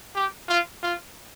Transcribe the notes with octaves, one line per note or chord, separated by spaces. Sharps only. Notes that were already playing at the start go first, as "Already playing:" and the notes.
G4
F4
F4